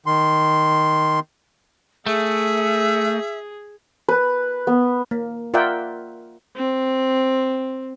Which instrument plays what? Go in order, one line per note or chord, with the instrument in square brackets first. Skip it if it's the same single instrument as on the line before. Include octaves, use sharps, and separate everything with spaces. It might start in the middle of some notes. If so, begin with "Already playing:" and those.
[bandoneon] D#3 C6
[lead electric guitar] A3 [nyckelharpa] G#4 [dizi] E5
[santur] B4
B3
[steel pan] A#3
F4 A#4 D5 E5 F#5 G5
[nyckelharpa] C4